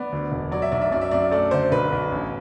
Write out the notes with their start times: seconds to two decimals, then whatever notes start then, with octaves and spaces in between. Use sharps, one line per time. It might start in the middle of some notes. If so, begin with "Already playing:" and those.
Already playing: B3 D5
0.12 D2
0.32 E1
0.51 F#3 D5
0.62 E5
0.72 B1 D5
0.82 E5
0.92 F#2 D5
1.01 E5
1.11 F#2 D5
1.31 A3 D5
1.51 D3 C5
1.72 B1 B4
1.92 B1
2.12 A1